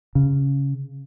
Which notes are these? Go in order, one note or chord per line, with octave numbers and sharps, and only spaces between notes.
C#3